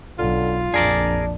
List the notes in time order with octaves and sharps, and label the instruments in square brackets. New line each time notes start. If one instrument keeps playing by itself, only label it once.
[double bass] B1 [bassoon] D3 [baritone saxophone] F4
[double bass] A#1 F2 [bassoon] D4 [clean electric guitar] G#4 A#4 D5